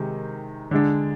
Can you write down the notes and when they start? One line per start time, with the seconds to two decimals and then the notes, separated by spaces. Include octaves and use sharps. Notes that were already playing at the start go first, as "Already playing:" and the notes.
Already playing: C3 D#3 G#3
0.71 D3 G#3 D4